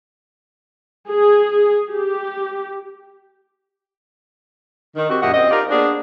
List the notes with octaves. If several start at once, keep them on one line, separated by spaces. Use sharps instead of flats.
G#4
G4
D#3
C4 F#4 G4
F#2 A#2 G4 D#5 E5 F#5
C4 D#5
D#4 F4 G4 A#4 D5
A#3 B3 D4 G#4 C5